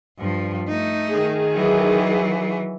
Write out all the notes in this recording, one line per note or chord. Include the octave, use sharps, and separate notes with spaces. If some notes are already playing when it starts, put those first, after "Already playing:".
G2 F3
A3 D#4
D#3 G#4
E3 F#3